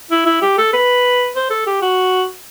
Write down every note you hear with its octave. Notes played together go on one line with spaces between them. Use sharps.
E4
E4
G4
A4
B4
C5
A4
G4
F#4